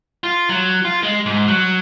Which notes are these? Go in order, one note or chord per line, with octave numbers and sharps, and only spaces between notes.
F4
F#3
F4
G#3
G#2
F#3